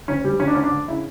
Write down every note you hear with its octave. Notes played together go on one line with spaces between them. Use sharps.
D2 C#4
D2 G3
D2 C#4
D4
D3 C#4
D4
D3
C#3 E4